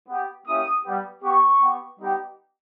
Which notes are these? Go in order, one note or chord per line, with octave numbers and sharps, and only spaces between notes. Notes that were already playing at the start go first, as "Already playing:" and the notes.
B3 G4
A#3 C#4 E4 G4 D#6
G3 B3 G4
B3 G4 C#6
B3 G4
G3 B3 D#4 G4